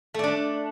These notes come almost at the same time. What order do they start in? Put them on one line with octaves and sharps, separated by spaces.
A3 D5 D4